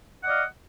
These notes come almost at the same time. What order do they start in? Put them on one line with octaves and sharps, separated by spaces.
F#5 D#5 D5 F5